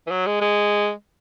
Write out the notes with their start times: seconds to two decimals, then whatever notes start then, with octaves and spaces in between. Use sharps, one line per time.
0.07 E3
0.11 F#3
0.26 G#3
0.41 G#3